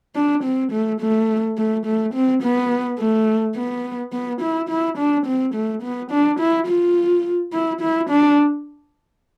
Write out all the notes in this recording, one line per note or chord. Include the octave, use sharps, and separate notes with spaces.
D4
C4
A3
A3
A3
A3
C4
B3
A3
B3
B3
E4
E4
D4
C4
A3
B3
D4
E4
F4
E4
E4
D4